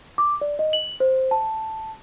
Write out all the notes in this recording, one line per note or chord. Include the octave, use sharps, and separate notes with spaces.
D6
D5
D#5
F#7
C5
A5